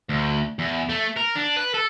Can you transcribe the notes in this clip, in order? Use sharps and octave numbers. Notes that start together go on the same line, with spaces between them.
D2
E2
A3
A#4
D4
B4
A4